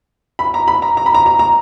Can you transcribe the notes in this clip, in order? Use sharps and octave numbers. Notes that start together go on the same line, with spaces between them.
B5
A#5
B5
A#5
A#5
B5
A#5
A#5
A#5